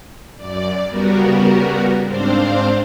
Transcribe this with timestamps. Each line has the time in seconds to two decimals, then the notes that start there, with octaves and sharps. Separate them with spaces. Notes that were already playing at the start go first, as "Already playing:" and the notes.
0.37 F#2 D5
0.88 C#3 G3 B3 F#4 A#4
2.05 G#2 C4 D4 C5 F5